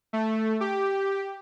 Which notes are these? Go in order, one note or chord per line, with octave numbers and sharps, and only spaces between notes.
A3
G4